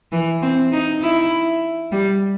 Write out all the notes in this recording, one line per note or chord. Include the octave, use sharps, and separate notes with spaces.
E3
C4
D#4
E4
G3